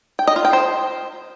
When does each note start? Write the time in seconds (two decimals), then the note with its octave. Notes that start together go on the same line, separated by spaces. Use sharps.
0.19 G5
0.27 D#5
0.36 F4
0.45 G5
0.53 C5